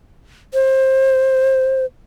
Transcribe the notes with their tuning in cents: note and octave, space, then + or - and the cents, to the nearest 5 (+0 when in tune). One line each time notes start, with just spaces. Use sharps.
C5 +25